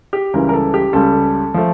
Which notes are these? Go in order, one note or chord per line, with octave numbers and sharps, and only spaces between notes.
G4
C#2 C#3 E3 G3 A#4
A#4
A4
G4
C#2 C#3 G3 A4
F3 A3